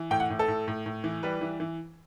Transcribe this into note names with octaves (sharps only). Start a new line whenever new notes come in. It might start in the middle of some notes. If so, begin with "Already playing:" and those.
Already playing: E3
A2 G5
F#5
A2
A4
A2
A2
A2
E3
G3 B4
E3
E3